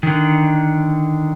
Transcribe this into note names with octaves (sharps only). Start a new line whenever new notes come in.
D3 D#3